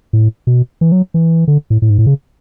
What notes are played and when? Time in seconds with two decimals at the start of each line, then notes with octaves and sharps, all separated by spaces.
0.13 A2
0.47 B2
0.81 E3
0.92 F#3
1.14 E3
1.48 D3
1.70 A2
1.82 A2
1.90 G#2
1.98 A2
2.06 C#3